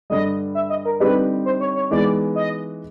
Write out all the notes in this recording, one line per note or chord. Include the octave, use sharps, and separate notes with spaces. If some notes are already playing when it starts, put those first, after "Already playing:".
G2 D3 G3 D#5
E5
D#5
A#4
D3 G3 C4 D#4 G4 B4
C5
C#5
C#5
E3 G#3 B3 D#4 D5
D#5